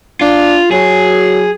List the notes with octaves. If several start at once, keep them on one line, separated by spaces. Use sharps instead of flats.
D4 F4
F#3 G#4